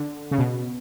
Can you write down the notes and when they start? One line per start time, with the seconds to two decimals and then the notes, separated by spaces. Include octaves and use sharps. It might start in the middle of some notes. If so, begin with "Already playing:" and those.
Already playing: D3
0.31 C#3
0.38 B2